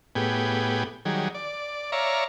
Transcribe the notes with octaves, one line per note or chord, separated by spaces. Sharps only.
A2 B3 G4 G#4
D#3 F#3 G3 G#4
D5
C#5 D5 E5 F5 A#5